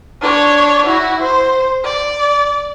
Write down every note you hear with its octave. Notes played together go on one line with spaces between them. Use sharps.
D4 C#5
E4 F#4
C5
D5